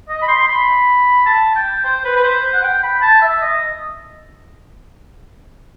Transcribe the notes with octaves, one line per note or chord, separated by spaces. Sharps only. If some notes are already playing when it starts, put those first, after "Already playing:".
D#5
B5
C6
B5
A5
G5
C5
B4
B4
C5
F#5
G5
B5
A5
E5
D#5